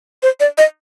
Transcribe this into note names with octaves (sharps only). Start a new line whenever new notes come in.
C5
D5
D#5